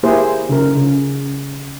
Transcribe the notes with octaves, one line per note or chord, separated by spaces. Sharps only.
A#3 E4 G4 G#4 C5
C#3 A#4
C#3